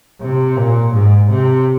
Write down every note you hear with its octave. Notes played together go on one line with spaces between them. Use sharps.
C3
A#2
G#2
C3